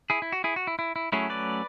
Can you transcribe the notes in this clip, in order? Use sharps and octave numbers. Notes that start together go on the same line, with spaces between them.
E4 G#4
E4
F#4
E4 G#4
F#4
E4
E4
E4
F#3 A3 C#4 E4 G#4
B4 D5